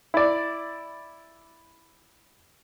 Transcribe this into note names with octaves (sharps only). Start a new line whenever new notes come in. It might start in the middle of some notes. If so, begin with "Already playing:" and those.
E4 D5